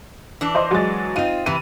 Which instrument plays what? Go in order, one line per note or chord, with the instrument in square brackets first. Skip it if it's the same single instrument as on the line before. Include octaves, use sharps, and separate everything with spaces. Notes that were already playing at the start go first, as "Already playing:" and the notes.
[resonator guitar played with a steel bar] E3 D4
[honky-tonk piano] C5 D#5 C6
F#3 G#3 A6
[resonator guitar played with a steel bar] C4 F4 [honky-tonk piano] D#4 D#7
[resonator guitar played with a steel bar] C3 E3 E4 [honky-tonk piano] D#7